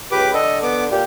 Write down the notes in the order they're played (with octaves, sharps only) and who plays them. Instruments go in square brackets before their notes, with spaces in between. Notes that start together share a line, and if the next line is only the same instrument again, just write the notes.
[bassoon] C#2 [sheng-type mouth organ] G4 B4 D6
[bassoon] D3 [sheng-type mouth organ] A4 D#5
[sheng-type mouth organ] B3 D6
[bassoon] A#2 [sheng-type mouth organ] G4